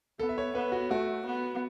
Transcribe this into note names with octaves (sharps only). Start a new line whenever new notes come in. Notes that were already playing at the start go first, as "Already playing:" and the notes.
B3 A4
E5
C#5
B3 B4
F#4
A3 F#4
B3